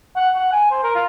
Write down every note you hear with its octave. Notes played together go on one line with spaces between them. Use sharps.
F#5
F#5
G#5
C5
A#4
F4